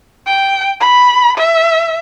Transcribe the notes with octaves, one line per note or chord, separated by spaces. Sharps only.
G5
B5
E5